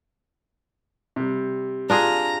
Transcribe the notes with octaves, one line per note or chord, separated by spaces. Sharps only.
C3 G3
D4 F4 G#4 A#5